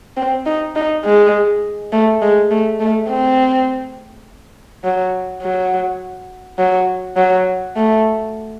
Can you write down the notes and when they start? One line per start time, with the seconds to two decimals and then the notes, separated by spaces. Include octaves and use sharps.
0.17 C4
0.46 D#4
0.76 D#4
1.05 G#3
1.93 A3
2.22 G#3
2.51 A3
2.80 A3
3.09 C4
4.84 F#3
5.43 F#3
6.58 F#3
7.17 F#3
7.76 A3